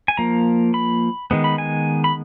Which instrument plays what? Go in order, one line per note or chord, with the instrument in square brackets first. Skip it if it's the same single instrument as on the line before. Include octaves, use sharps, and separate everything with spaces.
[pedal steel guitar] G#5
F3 A#3 A#5
B5
D#3 G#3 B3
B5
G#5
B5